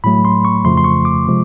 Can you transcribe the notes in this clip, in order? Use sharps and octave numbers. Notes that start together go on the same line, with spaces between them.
A2 F#3 A3 B5
C6
C#6
F2 C#3 F3 A3 C6
C6
C#6
D6
C3 F3 G#3